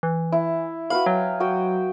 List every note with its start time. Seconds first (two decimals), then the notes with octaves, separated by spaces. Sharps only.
0.03 E3
0.32 E4
0.90 F#4 B4 F5 B5
1.06 F#3 G5
1.40 F#4 G5 D#6